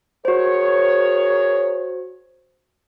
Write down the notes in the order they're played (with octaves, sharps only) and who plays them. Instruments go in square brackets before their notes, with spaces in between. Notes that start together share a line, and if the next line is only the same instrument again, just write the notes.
[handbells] F#4 C5 [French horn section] G#4 A#4 C#5